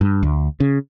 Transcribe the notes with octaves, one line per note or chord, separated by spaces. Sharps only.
G2
D2
C#3